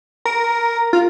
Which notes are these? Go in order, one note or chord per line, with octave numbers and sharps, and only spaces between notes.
A#4
F4